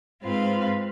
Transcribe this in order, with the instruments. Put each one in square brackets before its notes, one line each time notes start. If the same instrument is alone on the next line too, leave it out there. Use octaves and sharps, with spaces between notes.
[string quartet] G#2 C4 F4 B4 F5